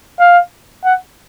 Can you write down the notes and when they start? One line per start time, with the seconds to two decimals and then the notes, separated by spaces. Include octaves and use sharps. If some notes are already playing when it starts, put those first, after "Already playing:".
0.19 F5
0.84 F#5